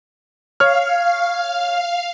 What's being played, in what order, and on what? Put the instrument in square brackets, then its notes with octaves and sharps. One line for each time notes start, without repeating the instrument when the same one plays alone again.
[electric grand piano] C#5 F6 [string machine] F5